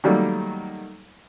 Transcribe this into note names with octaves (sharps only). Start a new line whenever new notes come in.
D#3 F#3 G3 A3 A#3